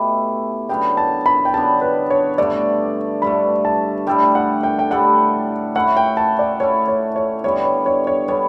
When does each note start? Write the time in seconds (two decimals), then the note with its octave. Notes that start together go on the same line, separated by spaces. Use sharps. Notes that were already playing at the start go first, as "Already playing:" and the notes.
Already playing: B2 A3 E4 G4
0.69 C#3 F#3 B3 D4 G5
0.97 A5
1.26 B5
1.45 G5
1.54 C#3 F#3 B3 D4 A5
1.81 B4
2.10 C#5
2.38 G2 D3 A3 D5
3.22 G2 D3 A3 B5
3.65 A5
4.07 A2 G3 D4 A4 G5
4.35 F#5
4.63 G5
4.79 G5
4.91 A2 G3 D4 A4 F#5
5.75 A3 C#4 E4 F#5
5.97 G5
6.17 A5
6.39 D5
6.60 A3 C#4 E4 C#5
6.88 C#5
7.16 C#5
7.44 D3 G3 B3 C#5
7.65 C#5
7.86 C#5
8.07 C#5
8.28 D3 G3 B3 C#5